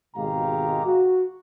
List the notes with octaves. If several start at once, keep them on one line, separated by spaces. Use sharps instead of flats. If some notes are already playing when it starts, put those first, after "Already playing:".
G#1 B2 G#3 G4 F5 A#5
F#4